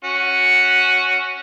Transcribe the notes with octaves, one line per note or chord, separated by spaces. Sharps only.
C#4 F#4